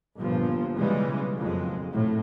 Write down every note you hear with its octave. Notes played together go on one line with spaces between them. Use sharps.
G1 G2 A#2 F3
B1 C#3 E3 G3 G#3
F#1 F2 G#3
F2 A2